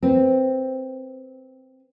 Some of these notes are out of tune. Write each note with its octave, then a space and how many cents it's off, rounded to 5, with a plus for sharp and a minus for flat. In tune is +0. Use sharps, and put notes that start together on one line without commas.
C4 +0 B4 +0